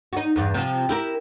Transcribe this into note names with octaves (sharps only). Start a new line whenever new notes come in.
D#4 F#4
E2 G2
C3 F3
E4 G4 A#4